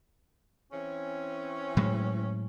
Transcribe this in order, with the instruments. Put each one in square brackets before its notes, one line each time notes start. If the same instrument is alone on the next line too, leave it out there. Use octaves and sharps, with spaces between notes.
[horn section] E3 C4 C#4
[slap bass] A2 F#3 G#3